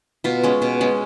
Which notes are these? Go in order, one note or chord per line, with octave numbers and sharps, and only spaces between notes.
B2 F4
G#3 C#4
B2
G#3 C#4